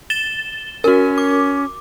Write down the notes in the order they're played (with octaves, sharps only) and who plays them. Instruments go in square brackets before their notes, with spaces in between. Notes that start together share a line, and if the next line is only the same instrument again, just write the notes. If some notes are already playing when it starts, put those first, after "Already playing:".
[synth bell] A6 E7 G7
[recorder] C#4 [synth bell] F#4 A#4
[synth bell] D6